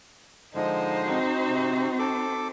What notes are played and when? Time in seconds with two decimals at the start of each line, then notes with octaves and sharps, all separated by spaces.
0.55 D3 F3 G#3 D#4 C5
1.04 C4 F#4
1.48 C3
1.99 A4 D6